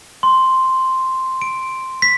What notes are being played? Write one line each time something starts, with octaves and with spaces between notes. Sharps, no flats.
C6
D7
B6